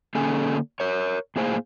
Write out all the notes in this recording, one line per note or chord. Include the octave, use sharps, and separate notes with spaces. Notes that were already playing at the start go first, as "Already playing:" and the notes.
D3 A#3 C#4 G#4 A4 G#5
A#4 C#5
A2 A#3 G#4 C5 F5